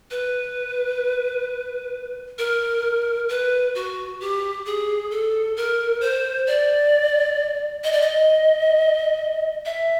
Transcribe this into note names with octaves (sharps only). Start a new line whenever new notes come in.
B4
A#4
B4
F#4
G4
G#4
A4
A#4
C5
D5
D#5
D5
D#5
E5